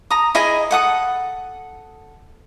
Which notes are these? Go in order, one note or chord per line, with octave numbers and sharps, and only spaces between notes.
A#5 D#6
E4 G#4 D#5 G#5
A4 F#5 D#6